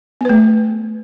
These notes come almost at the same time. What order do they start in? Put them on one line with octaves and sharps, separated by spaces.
B3 B4 A3